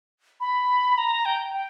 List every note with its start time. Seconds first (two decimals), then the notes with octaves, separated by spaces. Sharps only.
0.40 B5
0.98 A#5
1.25 G5
1.54 G5